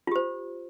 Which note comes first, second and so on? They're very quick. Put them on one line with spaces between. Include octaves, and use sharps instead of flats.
F4 G4 C5